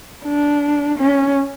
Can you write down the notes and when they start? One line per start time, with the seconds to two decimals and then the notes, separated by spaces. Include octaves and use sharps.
0.24 D4
0.98 C#4